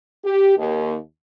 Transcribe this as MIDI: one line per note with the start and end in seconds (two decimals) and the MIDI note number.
0.25 0.57 67
0.58 0.96 39